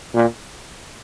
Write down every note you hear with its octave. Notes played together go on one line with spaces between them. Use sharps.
A#2